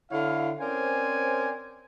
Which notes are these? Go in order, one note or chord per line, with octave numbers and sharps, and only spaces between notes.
D3 E4 C#5 F5
C4 C#4 A#4 C5 D5 G#5